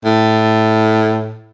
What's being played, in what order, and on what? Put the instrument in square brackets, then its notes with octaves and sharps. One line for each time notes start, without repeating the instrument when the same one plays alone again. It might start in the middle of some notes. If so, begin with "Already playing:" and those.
[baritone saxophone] A2